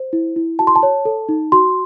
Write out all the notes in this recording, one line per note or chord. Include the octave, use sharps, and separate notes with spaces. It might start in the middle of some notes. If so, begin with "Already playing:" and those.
Already playing: C5
E4
E4
F#4 A5
C6
A5
C#5
A4
D#4
F#4 C6